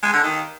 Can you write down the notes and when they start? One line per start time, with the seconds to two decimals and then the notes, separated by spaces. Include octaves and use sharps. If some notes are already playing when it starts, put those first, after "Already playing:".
0.03 G#3
0.13 D3
0.23 D#3